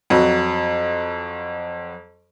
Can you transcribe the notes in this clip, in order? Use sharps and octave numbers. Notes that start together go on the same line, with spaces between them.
F2 F#3